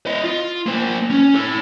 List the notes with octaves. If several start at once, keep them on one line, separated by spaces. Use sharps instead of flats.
E4 D#5
F4
A#3 C5
C#4
A4 C#5